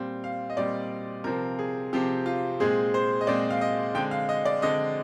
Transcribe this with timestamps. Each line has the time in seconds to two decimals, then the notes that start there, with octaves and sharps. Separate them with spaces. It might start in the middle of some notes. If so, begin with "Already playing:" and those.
Already playing: A#2 G3 C4
0.24 F5
0.50 D#5
0.57 A#2 G3 C4 D5
1.24 C3 F3 C4 A#4
1.59 G#4
1.93 C3 F3 C4 G4
2.26 F4
2.60 A#2 G#3 C4 G#4
2.94 C5
3.21 D#5
3.27 A#2 G#3 C4 D5
3.50 F5
3.61 D#5
3.95 D3 G#3 C4 G5
4.11 F5
4.29 D#5
4.45 D5
4.62 D3 G#3 C4 D#5